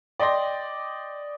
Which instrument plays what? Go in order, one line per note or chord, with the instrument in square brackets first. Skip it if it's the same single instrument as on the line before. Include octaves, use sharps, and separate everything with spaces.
[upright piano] D5 D#5 G5 C6 A#6